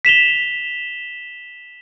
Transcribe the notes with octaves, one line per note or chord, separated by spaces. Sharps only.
B6 E7 F7 G7